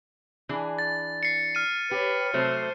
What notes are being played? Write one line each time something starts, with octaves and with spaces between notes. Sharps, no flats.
E3 D4 G#4
A6
C7 C#7
F6 D#7
G4 B4 C#5
C3 F#3 A3 C5